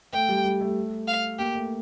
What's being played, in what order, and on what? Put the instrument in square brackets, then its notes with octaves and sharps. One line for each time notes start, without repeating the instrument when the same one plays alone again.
[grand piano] A3 [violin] G5
[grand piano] G3
G3
A3
[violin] F5
[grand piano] A#3 [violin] G4
[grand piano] A3